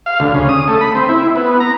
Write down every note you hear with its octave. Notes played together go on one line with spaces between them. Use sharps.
F5
D2
C#3
D#6
A3
B5
C4
E4
B3
A#5